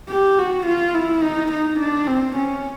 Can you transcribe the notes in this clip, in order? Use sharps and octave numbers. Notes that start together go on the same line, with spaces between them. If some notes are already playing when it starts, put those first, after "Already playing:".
G4
F#4
F4
E4
D#4
D#4
D4
C4
C#4